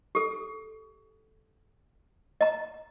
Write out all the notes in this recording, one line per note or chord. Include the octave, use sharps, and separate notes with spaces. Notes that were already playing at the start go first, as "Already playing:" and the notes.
G4 A4
D#5 A#5